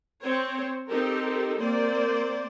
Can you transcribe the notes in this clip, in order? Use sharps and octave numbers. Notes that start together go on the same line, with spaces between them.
C4 C5 C#5
C4 D#4 G4 A4 A#4
A#3 C4 C5 D5